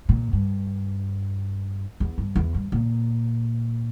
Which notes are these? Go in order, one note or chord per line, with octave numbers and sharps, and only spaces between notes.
A#2
G2
E2
G2
E2
G2
A#2